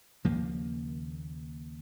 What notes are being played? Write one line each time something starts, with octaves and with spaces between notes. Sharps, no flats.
D#2 C#3 F3 A#3